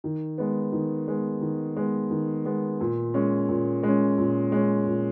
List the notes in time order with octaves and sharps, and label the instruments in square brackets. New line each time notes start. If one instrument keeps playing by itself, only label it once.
[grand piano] D#3
G#3 B3
D#3
G#3 B3
D#3
G#3 B3
D#3
G#3 B3
A#2
G#3 C#4
A#2
G#3 C#4
A#2
G#3 C#4
A#2